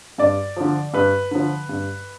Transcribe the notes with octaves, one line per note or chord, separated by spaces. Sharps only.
G2 D5
D3 F3
G2 B4
D3 F3
G2